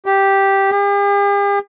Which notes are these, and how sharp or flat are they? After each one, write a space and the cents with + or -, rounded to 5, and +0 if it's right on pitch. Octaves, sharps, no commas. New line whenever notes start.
G4 -5
G4 +45